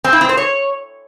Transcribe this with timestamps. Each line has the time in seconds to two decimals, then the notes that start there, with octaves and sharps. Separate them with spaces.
0.04 C4
0.13 E4
0.21 C4
0.29 C5
0.37 C#5